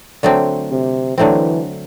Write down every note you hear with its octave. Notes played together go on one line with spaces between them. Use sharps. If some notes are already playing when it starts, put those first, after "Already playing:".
D3 F#3 A3 C4
C3
D3 E3 F#3 A3 C4